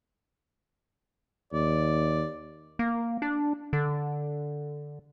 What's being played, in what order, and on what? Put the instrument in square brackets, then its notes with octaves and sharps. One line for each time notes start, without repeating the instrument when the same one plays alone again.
[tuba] D#2 [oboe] D5
[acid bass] A#3
D4
D3